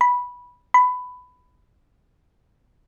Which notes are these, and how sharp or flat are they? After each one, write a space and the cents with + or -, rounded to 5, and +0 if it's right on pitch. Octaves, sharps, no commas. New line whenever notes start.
B5 -10
B5 +15